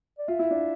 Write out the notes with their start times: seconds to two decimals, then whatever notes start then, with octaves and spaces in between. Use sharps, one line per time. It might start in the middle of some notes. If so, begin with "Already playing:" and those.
0.19 D5
0.28 F4 E5
0.39 E4
0.50 D4